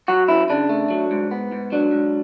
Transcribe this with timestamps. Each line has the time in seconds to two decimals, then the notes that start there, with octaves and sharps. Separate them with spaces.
0.08 F#3 F#4
0.28 F#2 E4
0.50 C#3 D4
0.69 A3
0.90 F#3
1.11 G#2
1.31 B3
1.52 G#2
1.72 F#3 D4
1.92 G#2